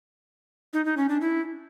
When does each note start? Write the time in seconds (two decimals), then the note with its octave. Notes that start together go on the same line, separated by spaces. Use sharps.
0.73 D#4
0.85 D#4
0.97 C#4
1.09 D4
1.21 E4